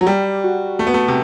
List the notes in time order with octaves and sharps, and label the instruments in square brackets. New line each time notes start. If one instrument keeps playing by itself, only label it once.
[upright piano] F#3 [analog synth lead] F#4
[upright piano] G3 [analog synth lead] G4
[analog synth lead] F#4
[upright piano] A3
B3
A3
C3